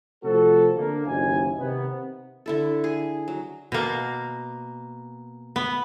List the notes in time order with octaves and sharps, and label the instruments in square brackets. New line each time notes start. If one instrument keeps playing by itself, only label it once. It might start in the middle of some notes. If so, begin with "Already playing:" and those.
[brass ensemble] C3 F3 A3 F#4 A4
D3 A#3
F#1 D#2 B2 E4 G#5
C3 D#3 B3
[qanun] D3 E4 A4
G#4
F#3
[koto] B2 A#3
B3